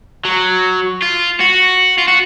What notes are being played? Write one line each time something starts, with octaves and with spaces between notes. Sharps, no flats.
F#3
F4
F#4
F4
F#4